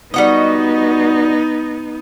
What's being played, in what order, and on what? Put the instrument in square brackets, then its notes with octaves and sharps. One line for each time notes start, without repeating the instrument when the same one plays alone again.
[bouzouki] G3 F#4 D#5 [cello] B3 D#4